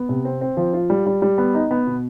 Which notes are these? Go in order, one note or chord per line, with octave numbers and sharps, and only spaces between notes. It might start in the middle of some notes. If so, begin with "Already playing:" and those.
Already playing: B3
C3
C4
C4
F3
F4
G3
G3
G3
B3
D#4
B3
B2